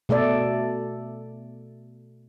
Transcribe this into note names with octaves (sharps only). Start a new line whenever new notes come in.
B2 A3 A4 D5